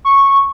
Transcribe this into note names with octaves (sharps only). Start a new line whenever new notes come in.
C#6